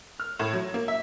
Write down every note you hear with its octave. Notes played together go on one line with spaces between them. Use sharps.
F6
A2
F#3
A#3
E5